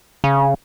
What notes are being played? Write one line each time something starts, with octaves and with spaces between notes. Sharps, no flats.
C#3